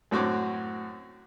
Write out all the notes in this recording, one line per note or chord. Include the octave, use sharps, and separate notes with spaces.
F#2 A2 C4 F#4 C#5 D6